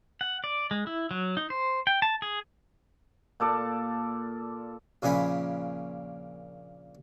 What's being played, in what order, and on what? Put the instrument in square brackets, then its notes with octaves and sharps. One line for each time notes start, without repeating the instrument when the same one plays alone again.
[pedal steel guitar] F#5
D5
G#3
E4
F#3
D#4
C5
G5
A5
G#4
[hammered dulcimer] A#2 A4 D5 A5
[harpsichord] A#1 A#2 C#3 C#4 G#5 B5